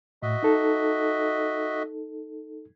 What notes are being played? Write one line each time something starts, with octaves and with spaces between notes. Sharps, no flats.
A2 F#4 D#5 E5
D#4 A4